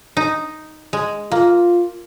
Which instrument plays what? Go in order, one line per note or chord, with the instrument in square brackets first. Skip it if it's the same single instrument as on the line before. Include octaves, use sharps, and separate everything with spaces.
[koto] D#4
G#3
[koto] A#3 [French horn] F4